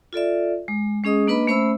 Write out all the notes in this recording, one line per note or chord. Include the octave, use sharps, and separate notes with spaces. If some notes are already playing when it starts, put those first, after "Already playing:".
F4 A4 D5 E5
G#3
G#3 C#4 G#4 D#5 D#6
A#3 D4 B4 D#5 B5
A3 C#4 C5 E5 B5 E6